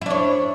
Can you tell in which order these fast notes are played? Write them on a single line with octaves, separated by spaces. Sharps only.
E4 D4 C#5